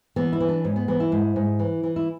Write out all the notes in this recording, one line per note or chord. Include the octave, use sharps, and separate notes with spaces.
E3 B3
E4
E3
D4
G#2 C#4
B3
E3 B3
E4
G#2
G#2
E3
E3
E4